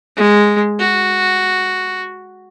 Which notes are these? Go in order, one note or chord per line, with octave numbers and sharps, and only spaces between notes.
G#3
F#4